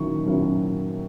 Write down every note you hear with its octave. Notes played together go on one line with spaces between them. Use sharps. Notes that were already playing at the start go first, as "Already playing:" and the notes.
Already playing: D#3 F#3 A#3 C#4 E4 C#6
F#3 A#3 C#4 E4